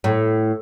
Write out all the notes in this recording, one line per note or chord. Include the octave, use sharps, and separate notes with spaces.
A2